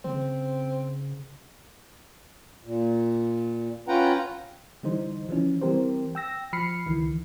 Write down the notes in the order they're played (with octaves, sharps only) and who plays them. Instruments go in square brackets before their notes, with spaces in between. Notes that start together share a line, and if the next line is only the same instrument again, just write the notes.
[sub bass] C#3 [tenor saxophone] C4
[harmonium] A#2
C#4 F4 B4 F#5 G5 A#5
[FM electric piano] D3 E3 G3 D#4 C5
E3 F3 C#4
E3 G3 C4 G4 A#4 C5
G5 E6 A#6
F3 B5 F6 C7 C#7
C#2 D#3 E3